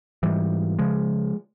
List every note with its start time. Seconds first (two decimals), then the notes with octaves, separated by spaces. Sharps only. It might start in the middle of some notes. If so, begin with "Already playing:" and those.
0.23 G#2 E3 G3
0.79 C#3 F3 G#3